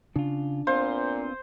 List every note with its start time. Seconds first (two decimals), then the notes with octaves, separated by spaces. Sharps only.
0.16 C#3 D4 F4
0.67 A#2 B3 C4 C5 F5